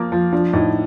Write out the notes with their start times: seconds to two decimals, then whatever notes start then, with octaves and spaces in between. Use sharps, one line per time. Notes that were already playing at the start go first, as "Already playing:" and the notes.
Already playing: F3 A#3
0.12 F3
0.32 F3 D4
0.53 A2 D#4